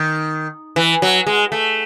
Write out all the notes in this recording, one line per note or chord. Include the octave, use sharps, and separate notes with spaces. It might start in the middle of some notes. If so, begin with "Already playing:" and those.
Already playing: D#3
E3
F#3
G#3
A3